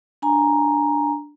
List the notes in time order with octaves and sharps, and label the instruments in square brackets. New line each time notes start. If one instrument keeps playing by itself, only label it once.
[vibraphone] D4 G#5 A#5